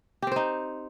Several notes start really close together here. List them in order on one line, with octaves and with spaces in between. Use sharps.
G4 C4 C5 D#4